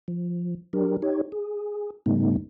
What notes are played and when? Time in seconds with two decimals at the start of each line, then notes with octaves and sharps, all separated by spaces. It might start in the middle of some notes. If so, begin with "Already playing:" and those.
0.08 F3
0.73 F#3 D4 G4 A#4
1.02 D#4 G4 C#5
1.32 G#4
2.06 G#2 C#3 G3 A3 B3 D#4